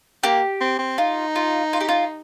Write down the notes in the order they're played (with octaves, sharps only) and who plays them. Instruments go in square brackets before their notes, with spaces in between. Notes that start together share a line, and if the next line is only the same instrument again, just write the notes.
[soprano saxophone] A#3 [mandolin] G4
[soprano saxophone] C4
C4
[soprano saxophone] D#4 [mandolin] F4
[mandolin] F4
F4
G4
F4